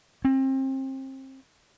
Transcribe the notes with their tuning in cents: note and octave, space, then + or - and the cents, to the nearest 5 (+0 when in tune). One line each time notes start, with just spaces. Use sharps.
C4 +30